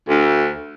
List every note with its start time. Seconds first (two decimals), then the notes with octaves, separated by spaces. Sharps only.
0.08 D2